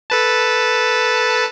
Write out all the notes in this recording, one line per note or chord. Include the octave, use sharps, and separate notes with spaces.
A4 B4 A5